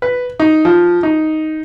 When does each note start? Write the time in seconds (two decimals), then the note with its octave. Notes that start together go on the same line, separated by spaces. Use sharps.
0.02 B4
0.40 D#4
0.65 F3
1.03 D#4